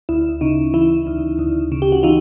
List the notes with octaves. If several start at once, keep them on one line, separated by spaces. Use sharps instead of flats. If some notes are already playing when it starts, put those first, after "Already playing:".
D2 E4
C#3 D#4
E3 E4
D2
D2
C#3
G4
F#4
E3 D#4 F4